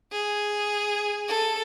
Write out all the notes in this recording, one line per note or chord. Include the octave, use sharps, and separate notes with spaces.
G#4
A4